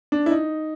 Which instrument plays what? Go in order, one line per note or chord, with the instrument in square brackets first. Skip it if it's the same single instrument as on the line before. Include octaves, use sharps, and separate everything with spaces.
[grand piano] D4
E4
D#4